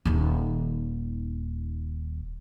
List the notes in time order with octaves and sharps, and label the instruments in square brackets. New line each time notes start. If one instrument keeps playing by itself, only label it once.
[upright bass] D#1 D#3